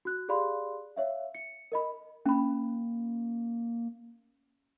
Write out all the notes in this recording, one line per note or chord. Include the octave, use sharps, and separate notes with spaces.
F#4 F#6
G4 G#4 D5 F5 B5 C6
C#5 E5 F5
C#7
A#4 D#5 B5
A#3 C#4 B5